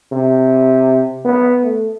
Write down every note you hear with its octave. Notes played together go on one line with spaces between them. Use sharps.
C3
B3
A3